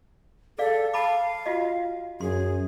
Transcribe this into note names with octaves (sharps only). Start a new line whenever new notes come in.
G#4 A4 D5 F5
F5 A5 B5 D6
F4 F#4 D#5
F#2 G#4 C6